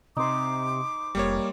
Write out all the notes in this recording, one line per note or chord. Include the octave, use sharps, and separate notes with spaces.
C3 D#4 C5 D6
F1 G3 A#3 C#5